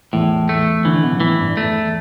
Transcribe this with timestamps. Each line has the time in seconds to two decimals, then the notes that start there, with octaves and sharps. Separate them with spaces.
0.13 E2 A2 E3
0.49 A3
0.85 D2 D3 E3
1.03 B1 B2
1.15 B2
1.20 A2 E3
1.39 G2
1.57 E2 A3